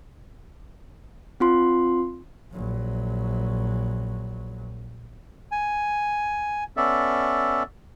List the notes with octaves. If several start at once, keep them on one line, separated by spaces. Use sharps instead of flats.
C4 F4 C6
A#1 F#3
G#5
B3 C#4 A4 D5 E5